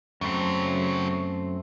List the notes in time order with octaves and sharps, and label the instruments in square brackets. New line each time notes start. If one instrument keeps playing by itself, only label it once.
[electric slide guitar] F#2 A3 C4 [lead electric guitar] C#3 F#3